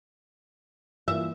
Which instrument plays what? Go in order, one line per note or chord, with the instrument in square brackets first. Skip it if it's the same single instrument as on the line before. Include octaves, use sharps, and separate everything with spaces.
[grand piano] E3 A#3 F4 [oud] E5